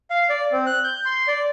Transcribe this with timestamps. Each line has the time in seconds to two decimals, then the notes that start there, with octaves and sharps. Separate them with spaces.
0.10 F5
0.29 D5
0.52 C4
0.66 F#6
0.84 G6
1.05 C6
1.28 D5